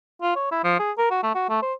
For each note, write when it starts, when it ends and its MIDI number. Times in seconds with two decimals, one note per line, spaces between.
0.22 0.35 65
0.36 0.48 73
0.51 0.63 64
0.64 0.77 53
0.79 0.91 68
0.98 1.09 70
1.11 1.19 66
1.23 1.32 57
1.35 1.45 66
1.49 1.61 57
1.62 1.73 72